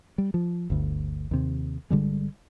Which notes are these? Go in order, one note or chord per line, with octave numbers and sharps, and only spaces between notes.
G3
F3
G1 D2
D#2 C3
G1 D3 G3 G#3